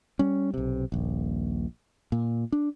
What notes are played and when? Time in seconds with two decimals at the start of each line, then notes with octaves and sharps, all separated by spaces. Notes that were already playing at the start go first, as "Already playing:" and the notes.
0.19 G3 C#4
0.54 B1 C3
0.92 D#1 A#1
2.12 A#2
2.52 D4